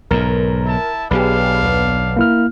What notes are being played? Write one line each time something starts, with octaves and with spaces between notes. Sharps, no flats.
B1 G#2 A#4
E4 A5
B1 D4 G4 G#4 B4 F5
D#2 B3
A#3 E4 F6